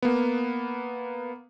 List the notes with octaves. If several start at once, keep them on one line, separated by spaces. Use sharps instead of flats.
A#3 B3